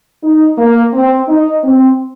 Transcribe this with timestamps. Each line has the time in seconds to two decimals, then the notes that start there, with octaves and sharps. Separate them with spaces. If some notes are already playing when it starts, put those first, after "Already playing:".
0.23 D#4
0.58 A#3
0.92 C4
1.28 D#4
1.63 C4